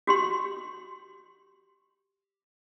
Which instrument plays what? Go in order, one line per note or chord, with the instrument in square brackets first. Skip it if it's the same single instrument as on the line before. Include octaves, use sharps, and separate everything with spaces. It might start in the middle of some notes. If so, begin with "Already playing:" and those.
[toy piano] F#4 G4 C6